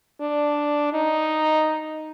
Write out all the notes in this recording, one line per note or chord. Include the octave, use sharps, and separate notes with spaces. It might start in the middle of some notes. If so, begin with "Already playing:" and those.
D4
D#4